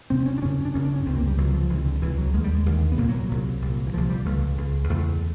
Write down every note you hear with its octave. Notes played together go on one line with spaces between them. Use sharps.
D2 C3 C4
C4
C#4
D4
F#2 C#3 C#4
D4
F#2 C#3 C#4
D4
C#4
C#2 C3 C4
A#3
G3
C#2 C3 F#3
F3
C#2 C3 E3
D3
C#2 C3 E3
F#3
D#2 D3 G#3
G3
G#3
D#2 D3
B3
C2 A#2 A#3
F#3
F#3
C2 A#2
C2 A#2
E3
C2 A#2 F3
G3
C#2 C#3 A3
C#2 C#3
E2 C#3 A3